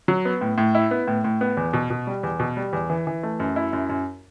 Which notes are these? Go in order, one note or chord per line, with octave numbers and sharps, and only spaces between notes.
F#3
B3
A2
A2
E4
B3
A2
A2
B3
E2
B2
B2
G3
E2
B2
G3
E2
E3
E3
A3
F#2
E4
F#2
F#2